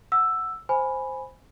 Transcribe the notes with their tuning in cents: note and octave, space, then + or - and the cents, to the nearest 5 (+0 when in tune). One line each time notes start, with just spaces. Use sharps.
F#5 -10 E6 +5
C5 +0 G#5 +0 B5 +0